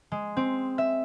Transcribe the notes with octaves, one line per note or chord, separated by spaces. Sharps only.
G#3
C4
E5